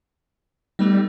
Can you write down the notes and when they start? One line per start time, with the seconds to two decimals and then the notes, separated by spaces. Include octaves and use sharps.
0.79 G3 A3 B3 D#4